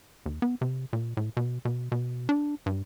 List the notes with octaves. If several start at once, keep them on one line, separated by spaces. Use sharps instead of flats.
D#2
B3
C3
A#2
A2
B2
B2
B2
D4
G2